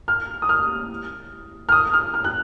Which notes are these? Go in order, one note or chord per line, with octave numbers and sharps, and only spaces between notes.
F6
D#6
F6
F6
D#6
F6
F6
F#6